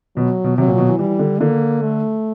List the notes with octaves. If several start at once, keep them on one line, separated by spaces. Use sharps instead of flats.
B2 F#3
B2
C3 F#3
A#2
B2
E3
E3 G3
D3
D3 A#3
A3